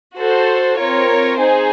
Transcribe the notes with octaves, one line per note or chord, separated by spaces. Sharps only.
F#4 A4 C5
C4 F4 A#4 C#5
D#4 G#4 C5